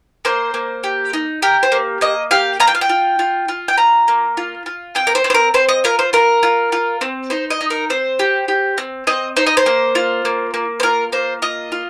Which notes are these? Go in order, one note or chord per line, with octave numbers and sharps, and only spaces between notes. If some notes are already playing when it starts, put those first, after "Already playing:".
A#3 C5
A#3
G4
D#4
G4 A#4
C5
A#3
A#3 D#5
G4 F5
F4 A#5
G5
F5
G5
F4
F4
F4
G5
F4 A#5
A#3
F4
F4
C4 G5
A#4
C5
C4
C5
A#4
C4 C5
D#5
F4 A#4
C5
F4 A#4
F4
F4
C4
D#4 C5
D#5
D#4
A#4
C4 C5
G4
G4
C4
C4 D#5
D#4 C5
D#5
C5
A#3
F4
A#3
A#3
C5
F4 A#4
A#3 C5
F4 D#5
F4